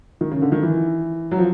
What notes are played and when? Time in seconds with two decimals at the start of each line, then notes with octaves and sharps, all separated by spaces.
0.21 D#3
0.31 C#3
0.42 D3
0.52 D#3
0.63 E3
1.31 F#3
1.38 F3